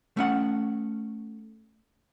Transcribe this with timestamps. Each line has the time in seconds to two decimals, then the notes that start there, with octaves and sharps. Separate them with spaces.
0.17 A3 C#4 F#5